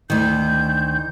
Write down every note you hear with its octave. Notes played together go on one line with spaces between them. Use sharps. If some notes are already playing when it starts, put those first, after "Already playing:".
D2 D#3 G6